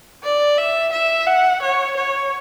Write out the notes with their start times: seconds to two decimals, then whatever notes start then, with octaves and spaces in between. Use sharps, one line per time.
0.23 D5
0.58 E5
0.93 E5
1.27 F#5
1.62 C#5
1.97 C#5